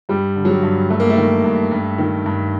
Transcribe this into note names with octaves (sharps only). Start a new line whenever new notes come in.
G2 G3
D3
F#3
G3
G2
G2 A3
A#3
A3
D#3
G2
G2
D#3
G2